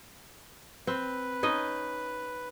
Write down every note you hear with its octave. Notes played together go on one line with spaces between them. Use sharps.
C4 B4
C#4 D#4 D#5